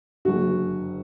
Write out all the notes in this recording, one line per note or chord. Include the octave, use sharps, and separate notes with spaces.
F#1 F#2 D3 F#4